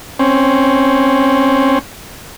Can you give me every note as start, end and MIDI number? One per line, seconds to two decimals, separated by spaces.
0.19 1.79 60
0.19 1.79 61